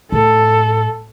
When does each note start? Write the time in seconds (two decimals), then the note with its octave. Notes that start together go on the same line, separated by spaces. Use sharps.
0.12 A2 A4